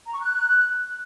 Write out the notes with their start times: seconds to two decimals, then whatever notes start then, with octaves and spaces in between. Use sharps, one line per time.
0.07 A#5
0.13 C#6
0.20 F#6